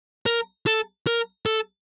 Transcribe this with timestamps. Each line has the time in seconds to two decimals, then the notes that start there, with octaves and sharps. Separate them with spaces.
0.26 A#4
0.67 A4
1.07 A#4
1.46 A4